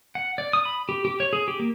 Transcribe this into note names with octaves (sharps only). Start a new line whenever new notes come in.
F#5
D5
D#6
B5
G4
G4
C#5
G#4
G4
A#3